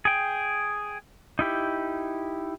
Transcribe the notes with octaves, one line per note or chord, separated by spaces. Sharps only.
G#4 G5
D#4 E4 G4